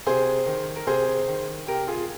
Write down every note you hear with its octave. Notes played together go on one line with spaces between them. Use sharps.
C3 G#4 C5
D#3
A#4
C3 G#4 C5
D#3
C3 G4 A#4
F4 G#4